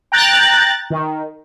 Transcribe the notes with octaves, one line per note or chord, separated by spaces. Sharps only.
G5 A#5 F#6 A6
D#3